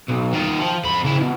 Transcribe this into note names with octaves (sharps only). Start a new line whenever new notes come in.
B1
D#3 F4
F3
F2 B5
C#3 E4
B2